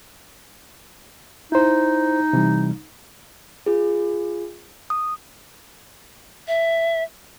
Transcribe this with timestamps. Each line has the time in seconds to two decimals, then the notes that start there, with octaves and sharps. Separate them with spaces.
1.52 D#4 E4 C5
2.33 C3 E3 G3
3.66 F4 G#4
4.90 D#6
6.47 E5